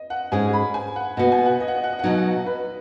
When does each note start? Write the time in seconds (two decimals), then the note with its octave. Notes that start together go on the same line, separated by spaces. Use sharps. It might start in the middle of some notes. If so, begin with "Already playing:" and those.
Already playing: D#5
0.10 F#5
0.32 G#2 G#3 C#4 G#4 G#5
0.53 B5
0.74 G#5
0.96 F#5
1.17 B2 B3 F#4 D#5
1.32 G#5
1.46 F#5
1.60 D#5
1.68 F#5
1.76 D#5
1.84 F#5
1.92 D#5
1.99 F#5
2.04 B2 F#3 D#4 D#5
2.15 F#5
2.22 D#5
2.30 F#5
2.39 D#5
2.46 B4